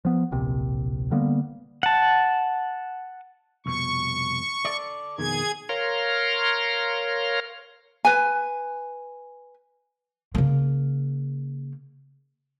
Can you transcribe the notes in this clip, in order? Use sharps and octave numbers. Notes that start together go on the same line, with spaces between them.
F3 B3
D1 A#1 C3
D3 G3 A#3 B3
F#5 A5
C2 F2 B2 C#6
A4 D5
F2 B2 D#3 G#4 G#6
A#4 C#5 F5 A#5 C6
B4 G#5
C#3 A#3